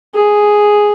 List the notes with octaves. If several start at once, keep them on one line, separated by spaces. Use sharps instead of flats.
G#4